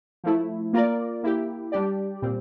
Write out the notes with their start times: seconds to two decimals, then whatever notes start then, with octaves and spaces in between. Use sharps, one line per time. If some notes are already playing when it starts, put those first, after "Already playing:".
0.24 F3 A3 E4
0.73 A#3 F4 A#4 D5
1.23 A#3 E4 G4
1.72 G3 D4 G4 D5
2.22 A#2 G3 C4